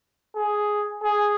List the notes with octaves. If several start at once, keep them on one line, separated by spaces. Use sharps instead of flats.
G#4
G#4